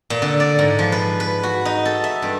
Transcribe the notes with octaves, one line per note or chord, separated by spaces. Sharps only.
A#2
D3
D5
G#2
F3
B4
B4
F#4
D#4
A4
E5
G2